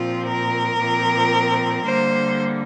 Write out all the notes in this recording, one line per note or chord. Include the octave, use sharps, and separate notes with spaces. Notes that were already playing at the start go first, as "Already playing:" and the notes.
Already playing: A#2 F3 C4 F4
A#4
A#2 F3 C4
D3 G3 A#3 C5